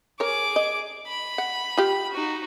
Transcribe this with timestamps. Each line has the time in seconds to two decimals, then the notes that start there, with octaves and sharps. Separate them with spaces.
0.20 G#4 A#4 C#5 D6
0.56 D#5
1.07 B5
1.38 F#5
1.78 F4 G4
2.12 D#4 F#4